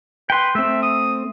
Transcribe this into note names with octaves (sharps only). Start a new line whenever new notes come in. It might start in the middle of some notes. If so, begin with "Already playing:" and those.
B4 G5 C6
A3 C4 E5
D#6